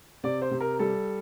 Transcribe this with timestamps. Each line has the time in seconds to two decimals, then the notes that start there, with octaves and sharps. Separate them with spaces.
0.24 C3 D5
0.42 C5
0.51 C3
0.60 A#4
0.79 G3 A4